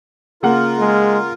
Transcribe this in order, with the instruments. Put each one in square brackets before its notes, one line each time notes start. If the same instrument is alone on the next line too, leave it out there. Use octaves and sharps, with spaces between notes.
[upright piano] C#3 A#3 F#5 [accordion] F4 A#4
[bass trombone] G#3